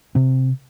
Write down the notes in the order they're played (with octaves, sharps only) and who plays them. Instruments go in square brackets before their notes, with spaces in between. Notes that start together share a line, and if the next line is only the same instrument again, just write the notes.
[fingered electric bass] C3 C4